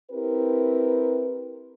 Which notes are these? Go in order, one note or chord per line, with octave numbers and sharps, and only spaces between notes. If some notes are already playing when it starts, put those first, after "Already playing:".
C4 E4 G4 A#4 B4